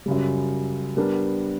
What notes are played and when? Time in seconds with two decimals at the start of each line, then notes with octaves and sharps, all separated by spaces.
0.06 F#2 C#3 G3
0.97 G3 B3 D4 A#4